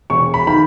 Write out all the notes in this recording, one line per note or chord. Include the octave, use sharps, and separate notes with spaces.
E1 C#6
B5
D#3 B5